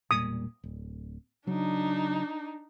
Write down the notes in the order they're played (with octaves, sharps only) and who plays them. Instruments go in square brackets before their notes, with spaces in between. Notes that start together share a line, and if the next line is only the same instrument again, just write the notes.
[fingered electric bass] E1 A#2 G3 [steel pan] D#6
[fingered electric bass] D1
[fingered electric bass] C#3 F#3 [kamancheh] D4 D#4